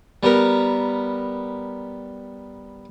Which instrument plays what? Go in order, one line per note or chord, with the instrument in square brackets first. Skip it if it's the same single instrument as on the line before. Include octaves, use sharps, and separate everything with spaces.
[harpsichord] G3 B3 A#4